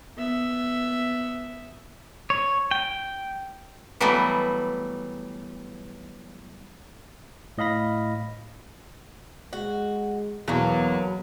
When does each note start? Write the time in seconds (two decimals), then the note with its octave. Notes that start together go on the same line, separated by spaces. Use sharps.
0.16 B3 E5
2.30 C#5
2.71 G5
4.00 E3 F#3 G3 A3 B3
7.58 A2 D#5 F5 B5 A#6
9.53 G#3 F#4
10.48 E2 B2 F#3 A#3